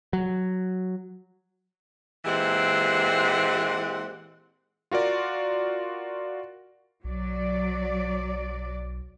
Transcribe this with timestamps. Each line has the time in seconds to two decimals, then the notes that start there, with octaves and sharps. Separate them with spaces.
0.13 F#3
2.25 A#2 E3 G#3 C4 G4 F#5
4.91 F4 F#4 A#4 D5
7.04 B1 F#3 D5